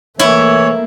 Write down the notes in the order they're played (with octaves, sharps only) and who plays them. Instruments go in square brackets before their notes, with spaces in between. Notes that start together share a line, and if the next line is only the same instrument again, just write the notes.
[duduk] E3 [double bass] A3 A#3 [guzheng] E4 [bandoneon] C#5